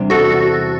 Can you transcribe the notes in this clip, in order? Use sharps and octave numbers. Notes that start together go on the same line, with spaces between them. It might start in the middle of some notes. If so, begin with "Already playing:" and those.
Already playing: E2 C3 G3 D4
F#4 A4